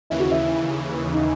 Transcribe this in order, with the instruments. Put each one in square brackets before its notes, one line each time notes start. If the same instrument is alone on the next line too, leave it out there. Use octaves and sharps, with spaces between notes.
[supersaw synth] D#2 C#3 E3 [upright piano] E4
[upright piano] F#4
E4
D#4